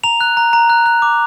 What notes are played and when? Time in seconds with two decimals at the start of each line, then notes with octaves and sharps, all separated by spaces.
0.04 A#5 F7
0.21 F#6
0.37 A#5
0.53 A#5
0.70 F#6
0.86 F#6
1.02 D6